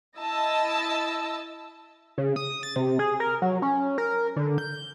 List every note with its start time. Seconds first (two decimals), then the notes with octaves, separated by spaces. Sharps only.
0.19 E4 D#5 A5 E6
2.18 C#3
2.36 D#6
2.63 A6
2.76 C3
2.99 G#4
3.20 A#4
3.42 F#3
3.62 C#4
3.98 A#4
4.36 D3
4.58 G6